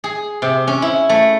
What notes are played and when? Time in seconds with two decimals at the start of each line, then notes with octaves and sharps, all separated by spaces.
0.04 G#4
0.42 C3
0.67 C#4
0.82 E4
1.09 A3